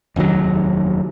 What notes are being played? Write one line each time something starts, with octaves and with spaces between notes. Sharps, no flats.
F1 D#2 D#3 F#3